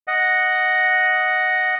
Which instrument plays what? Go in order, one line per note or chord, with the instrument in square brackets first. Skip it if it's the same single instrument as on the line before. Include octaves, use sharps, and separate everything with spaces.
[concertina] D#5 F#5